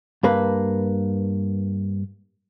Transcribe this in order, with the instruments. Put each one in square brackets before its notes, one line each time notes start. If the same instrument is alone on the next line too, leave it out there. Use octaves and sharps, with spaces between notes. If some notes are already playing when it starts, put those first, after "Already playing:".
[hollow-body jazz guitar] G2 A#3 B4